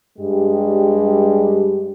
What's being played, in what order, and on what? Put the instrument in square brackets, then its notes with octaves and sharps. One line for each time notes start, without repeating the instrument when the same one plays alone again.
[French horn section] G2 G3 G#3 G4